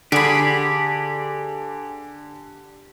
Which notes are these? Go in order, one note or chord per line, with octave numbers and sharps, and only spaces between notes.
D3 G4 G#4 D5 B5